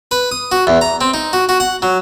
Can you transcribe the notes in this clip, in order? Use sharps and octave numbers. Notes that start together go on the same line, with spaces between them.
B4
D#6
F#4
E2
A#5
C4
D#4
F#4
F#4
F#5
F#3